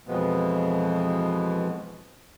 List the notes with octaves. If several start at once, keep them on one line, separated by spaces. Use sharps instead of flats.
F2 B2 E3 F3 G#3 B3